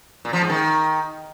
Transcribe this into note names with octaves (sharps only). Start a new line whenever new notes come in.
A#2
F3
G#2
D#3